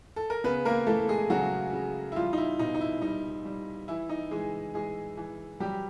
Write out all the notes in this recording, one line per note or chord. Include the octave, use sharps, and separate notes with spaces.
A4
A#4
C#3 B3 B4
A#3 A#4
E3 A3 A4
G#3 G#4
C#3 F#3 F#4
C#3
E4
F3 G3 F4
D#4
E4
B2 D#4
D#4
E4
G3 D#4
G3
E3 E4
D#4
E3 G#3 G#4
E3 G#3 G#4
E3
F#3 G3 G4